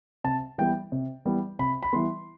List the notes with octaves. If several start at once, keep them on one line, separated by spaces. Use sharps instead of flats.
C3 A5
E3 G3 B3 G5
C3
E3 G3 B3
C3 B5
B5
E3 G3 B3 C6